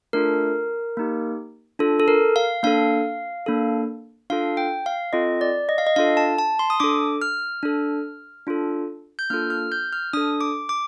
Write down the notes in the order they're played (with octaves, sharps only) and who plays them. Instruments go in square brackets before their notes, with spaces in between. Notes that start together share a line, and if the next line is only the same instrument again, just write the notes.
[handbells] A3 D4 F4 A4 A#4
A#3 D#4 G4
D4 F4 A4
A4
A#4
F5
A#3 D4 A4 F5
A#3 D4 A4
D4 F4 A4 F5
G5
F5
C4 F4 A4 D#5
D5
D#5
F5
D#5
D4 F4 A4 F5
A5
A5
C6
D#6
D4 A4 D6
F6
D4 A4
D4 F4 A4
G6
A#3 D4 F4 A4 F6
F6
G6
F6
D4 A4 D#6
D6
D6